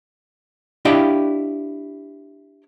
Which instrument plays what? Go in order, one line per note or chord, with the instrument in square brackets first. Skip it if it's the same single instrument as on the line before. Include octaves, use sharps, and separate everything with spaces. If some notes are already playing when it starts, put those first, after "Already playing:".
[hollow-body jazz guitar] D4 E4 G4 D#5 F5 G5